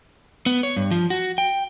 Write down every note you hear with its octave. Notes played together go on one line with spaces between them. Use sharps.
B3
C#5
G2
F3
F#4
G5